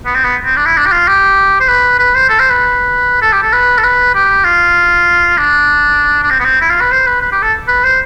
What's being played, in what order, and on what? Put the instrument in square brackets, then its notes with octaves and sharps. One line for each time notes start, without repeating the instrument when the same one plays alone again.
[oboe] B3
C4
B3
C4
D4
E4
D4
G4
F4
G4
C5
B4
B4
C5
A4
C5
B4
A4
G4
A4
B4
A4
B4
G4
F4
D4
D4
C4
B3
C4
E4
F4
B4
C5
B4
B4
G4
A4
B4
C5